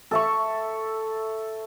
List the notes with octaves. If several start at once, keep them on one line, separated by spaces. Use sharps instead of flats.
A4 E5 C#6